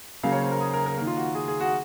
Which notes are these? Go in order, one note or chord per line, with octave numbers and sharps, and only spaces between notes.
C#3 F#3 A#3 F5
C#5
C5
A#4
G#4
A#4
A#4
D#3 A#3 A#4
F4
F#4
G#4
G#4
F#4